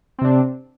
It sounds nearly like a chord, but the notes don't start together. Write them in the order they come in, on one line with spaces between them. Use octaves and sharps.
C4 C3 D4